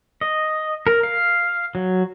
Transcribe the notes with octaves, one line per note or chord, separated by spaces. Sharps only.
D#5
A#4
F5
F#3